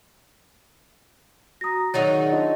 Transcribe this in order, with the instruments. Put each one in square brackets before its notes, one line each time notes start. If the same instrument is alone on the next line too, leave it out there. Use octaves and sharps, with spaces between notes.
[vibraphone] F#4 A#5 [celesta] D#6 A#6
[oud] D#3 F#3 D#4 [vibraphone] G#4 D5 F#5 [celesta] C#5 [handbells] A6
[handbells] D4 F4 D#5